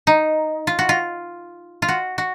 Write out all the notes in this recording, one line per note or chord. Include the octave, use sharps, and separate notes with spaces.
D#4
F4
F#4
F4
F4
F#4
F#4